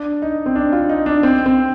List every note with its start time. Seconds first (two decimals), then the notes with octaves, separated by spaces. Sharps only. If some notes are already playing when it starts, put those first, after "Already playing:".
Already playing: D4
0.22 D#4
0.46 C4
0.56 D4
0.72 F4
0.89 D#4
1.06 D4
1.23 C4
1.46 C4